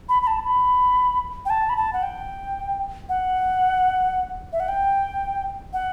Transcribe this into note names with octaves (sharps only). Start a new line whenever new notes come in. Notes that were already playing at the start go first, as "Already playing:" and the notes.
B5
B5
A5
B5
G5
A5
B5
A5
F#5
G5
F#5
E5
F#5
G5
F#5